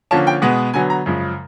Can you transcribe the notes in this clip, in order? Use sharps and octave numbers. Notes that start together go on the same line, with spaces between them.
D3 F3 A#3 C#4 A5
G5
B2 G#3 B3
D3 F#3 B3 G#5
A#5
F#2 C#3 F3 G#3